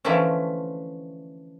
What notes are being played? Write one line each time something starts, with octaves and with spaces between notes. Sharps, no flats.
D3 E3 F3 A3 C4 C#4